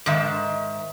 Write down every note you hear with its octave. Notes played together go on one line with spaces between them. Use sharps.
G#2 D#3 E5